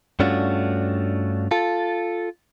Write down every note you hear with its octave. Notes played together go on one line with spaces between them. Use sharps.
G2 A3 C#4 D4 F4 F#4
F4 A4